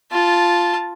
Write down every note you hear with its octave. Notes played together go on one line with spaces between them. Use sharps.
F4 A5